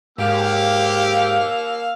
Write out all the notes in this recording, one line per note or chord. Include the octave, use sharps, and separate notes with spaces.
G#2 A#3 G4 F5 E6